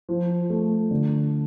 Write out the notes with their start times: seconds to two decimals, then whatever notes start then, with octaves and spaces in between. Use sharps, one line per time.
0.09 F3
0.50 A3
0.91 D3